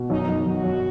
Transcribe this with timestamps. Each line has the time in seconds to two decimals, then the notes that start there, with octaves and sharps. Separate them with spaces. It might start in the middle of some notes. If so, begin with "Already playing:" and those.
Already playing: B2
0.10 F#2 D#4
0.29 F#2
0.46 F#2 F#4
0.64 F#2